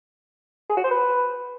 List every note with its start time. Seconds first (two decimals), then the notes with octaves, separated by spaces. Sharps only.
0.70 G#4
0.77 F#4
0.84 C5
0.91 B4